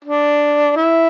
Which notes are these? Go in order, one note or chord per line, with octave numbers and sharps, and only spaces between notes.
D4
E4